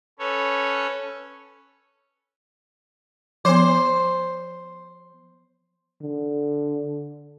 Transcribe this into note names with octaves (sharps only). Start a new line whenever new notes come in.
C#4 A4 B4 C#5
F3 B3 C5
D3